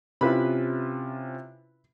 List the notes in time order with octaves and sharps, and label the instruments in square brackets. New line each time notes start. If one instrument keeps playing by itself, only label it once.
[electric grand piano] C3 C#4 F4 [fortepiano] E4 B4 B5